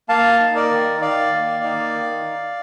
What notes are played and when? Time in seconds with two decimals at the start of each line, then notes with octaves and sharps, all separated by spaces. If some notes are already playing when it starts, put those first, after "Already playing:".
0.09 A#3 F5 A5
0.40 D#4
0.55 A#4 D5
0.71 D#3
1.01 D#3 D5 F5
1.32 A#3
1.64 D#4
1.94 D#3